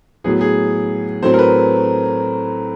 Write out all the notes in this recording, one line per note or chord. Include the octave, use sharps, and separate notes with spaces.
A2 F#3 B3 G#4
G#4
A2 F#3 A3 C4 C5
A#4
B4